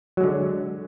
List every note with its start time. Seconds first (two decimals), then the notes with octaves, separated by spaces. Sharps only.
0.17 F#3
0.20 G#3
0.23 D3